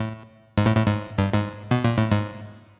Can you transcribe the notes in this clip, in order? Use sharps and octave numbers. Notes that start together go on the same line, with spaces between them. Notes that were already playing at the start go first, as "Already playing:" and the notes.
Already playing: A2
G#2
A2
A2
G#2
G2
G#2
B2
A#2
A2
G#2